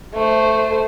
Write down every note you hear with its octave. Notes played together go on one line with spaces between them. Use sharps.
A3 C5